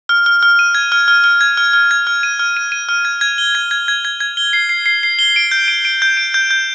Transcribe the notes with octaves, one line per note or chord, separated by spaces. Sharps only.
F6
F6
F6
D#7
G#6
F6
F6
F6
G#6
F6
F6
G#6
F6
D#7
F6
D#7
D#7
F6
G#6
G#6
G7
G#6
G#6
G#6
G#6
G#6
G7
C7
C7
C7
C7
G7
D7
G6
D7
D7
G6
D7
G6
G6